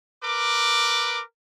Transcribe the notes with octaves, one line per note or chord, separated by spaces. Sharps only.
A#4 B4 D6